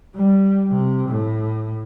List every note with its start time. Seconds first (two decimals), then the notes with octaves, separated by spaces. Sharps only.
0.15 G3
0.70 C3
1.09 A2